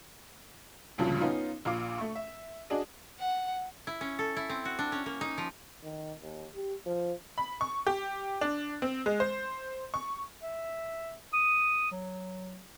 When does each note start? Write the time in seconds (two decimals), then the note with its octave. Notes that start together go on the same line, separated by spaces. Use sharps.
0.98 G#1 D2 G2 A#2 C#3 F3
1.21 B3 C#4 D#4 F4
1.65 A#1 A#2 F4 F5 D6
1.98 A3 C#6
2.15 E5
2.70 D4 F#4 G#4 D5 D#5
3.19 F#5
3.87 E4
4.01 C#4
4.19 A4
4.37 E4
4.49 C4
4.65 F#4
4.79 D4
4.92 C#4
5.06 A#3
5.21 D#4
5.38 F3
5.84 D#3
6.22 D#2
6.54 G4
6.86 F3
7.38 B5
7.61 C#6
7.87 G4
8.41 D4
8.82 C4
9.06 G#3
9.20 C5
9.94 C#6
10.42 E5
11.33 D#6
11.92 F#3